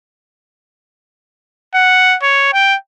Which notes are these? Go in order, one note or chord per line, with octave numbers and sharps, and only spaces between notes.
F#5
C#5
G5